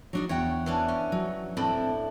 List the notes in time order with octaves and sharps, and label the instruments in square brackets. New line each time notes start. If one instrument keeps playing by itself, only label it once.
[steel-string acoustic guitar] F#3 D4 D#4
[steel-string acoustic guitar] E2 G5 [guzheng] F#4 C#5
[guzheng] E3 C#4 D4
C#4
[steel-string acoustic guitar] F#3
[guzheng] A2 D4 E4 [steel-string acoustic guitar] C4